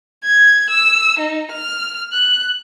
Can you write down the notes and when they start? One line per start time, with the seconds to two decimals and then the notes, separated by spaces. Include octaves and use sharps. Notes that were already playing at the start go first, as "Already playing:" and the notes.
0.25 G#6
0.70 E6
1.20 D#4
1.52 F6
2.13 F#6